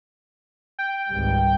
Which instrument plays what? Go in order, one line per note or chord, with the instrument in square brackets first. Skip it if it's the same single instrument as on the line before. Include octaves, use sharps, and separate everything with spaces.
[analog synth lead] G5
[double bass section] G#1 C#2 G3